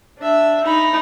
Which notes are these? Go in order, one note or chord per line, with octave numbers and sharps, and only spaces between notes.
D4 E5
D#4 B5